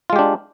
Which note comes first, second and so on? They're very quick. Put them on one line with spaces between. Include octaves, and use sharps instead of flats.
F4 G#3 G4 D4